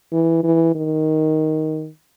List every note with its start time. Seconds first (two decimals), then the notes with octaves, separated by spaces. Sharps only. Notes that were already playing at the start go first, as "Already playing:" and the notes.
0.13 E3
0.44 E3
0.75 D#3